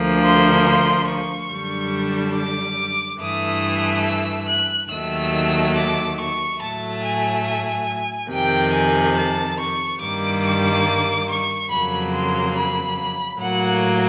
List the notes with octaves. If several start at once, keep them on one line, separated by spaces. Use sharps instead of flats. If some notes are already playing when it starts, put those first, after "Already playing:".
Already playing: D2 D3 F3 A#3
C6
C#6
F#2 D3 G3
D6
G2 E3 A3 D#6
E6
F#6
D#2 D#3 F#3 A3 E6
D6
C#6
A2 F#3 A3 A5
G#5
G#5
F2 C3 D#3 G5
G#5
A5
C#6
G2 D#3 G3 A#3 D6
D6
C#6
F2 C#3 F#3 A#3 B5
C6
B5
A2 F#3 A#3 F#5